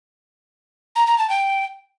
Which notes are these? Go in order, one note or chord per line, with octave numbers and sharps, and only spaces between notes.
A#5
A#5
A5
G5